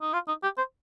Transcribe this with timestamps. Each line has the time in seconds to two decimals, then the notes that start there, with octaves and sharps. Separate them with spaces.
0.02 D#4
0.13 F4
0.28 D#4
0.43 G4
0.58 C5